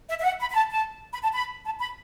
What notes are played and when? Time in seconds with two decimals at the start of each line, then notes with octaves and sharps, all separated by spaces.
0.09 E5
0.20 E5
0.24 F#5
0.40 B5
0.51 B5
0.55 A5
0.71 A5
1.12 B5
1.23 A5
1.33 B5
1.65 A5
1.79 B5